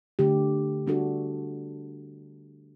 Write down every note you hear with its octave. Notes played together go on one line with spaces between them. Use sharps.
D3 A3 D4 G4
G3 D4 F#4 A4